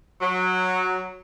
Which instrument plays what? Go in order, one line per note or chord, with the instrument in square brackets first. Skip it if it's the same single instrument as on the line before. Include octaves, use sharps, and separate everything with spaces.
[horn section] F#3